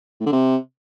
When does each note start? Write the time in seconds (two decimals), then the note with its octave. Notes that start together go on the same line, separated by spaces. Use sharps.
0.20 A2
0.26 D3
0.32 C3